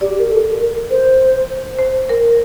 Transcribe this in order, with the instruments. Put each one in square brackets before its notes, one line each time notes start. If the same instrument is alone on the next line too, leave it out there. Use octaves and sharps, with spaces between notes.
[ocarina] G4 [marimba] D5
[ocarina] A#4
A4
A#4
C5
[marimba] C5
A#4